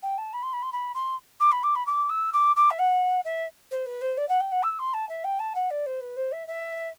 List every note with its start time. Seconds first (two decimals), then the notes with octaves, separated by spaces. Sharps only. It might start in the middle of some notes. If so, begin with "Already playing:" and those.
0.03 G5
0.18 A5
0.33 B5
0.43 C6
0.53 B5
0.62 C6
0.72 B5
0.94 C6
1.40 D6
1.52 B5
1.63 D6
1.75 B5
1.86 D6
2.09 E6
2.33 D6
2.56 D6
2.70 E5
2.79 F#5
3.25 E5
3.71 C5
3.86 B4
4.01 C5
4.17 D5
4.28 F#5
4.40 G5
4.52 F#5
4.63 E6
4.79 C6
4.93 A5
5.09 E5
5.24 G5
5.39 A5
5.55 F#5
5.70 D5
5.86 C5
6.01 B4
6.16 C5
6.32 E5
6.47 E5